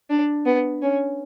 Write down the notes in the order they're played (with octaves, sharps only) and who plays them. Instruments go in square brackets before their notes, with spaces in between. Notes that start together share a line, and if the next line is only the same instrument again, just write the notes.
[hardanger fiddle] D4
B3
C#4